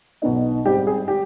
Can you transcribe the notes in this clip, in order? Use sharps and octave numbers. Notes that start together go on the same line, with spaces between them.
B1 B2 B3 D#4
G#2 G3 C4 D#4 G4
G#4
G3 G4